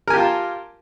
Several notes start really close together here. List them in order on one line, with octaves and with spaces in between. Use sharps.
A#4 G#5 G4 F4 A5